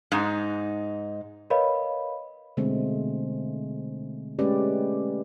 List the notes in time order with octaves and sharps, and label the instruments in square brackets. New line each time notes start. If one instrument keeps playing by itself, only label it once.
[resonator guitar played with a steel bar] G#2 D#4
[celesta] A#4 B4 C#5 D#5 F5 B5
[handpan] B2 D3 G#3 A3 C4
G#3 A3 C#4 G4 B4 D5